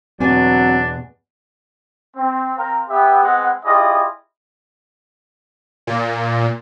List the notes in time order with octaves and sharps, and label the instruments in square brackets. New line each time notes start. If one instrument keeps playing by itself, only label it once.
[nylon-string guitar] E2 B2 G#5 [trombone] F#3 [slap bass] C4 [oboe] D4
[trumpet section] C4
C4 A#4 F5 A#5
B3 G4 E5
G#3 B3 C4 F#5
E4 F4 G4 G#4 D5 D#5
[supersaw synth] A#2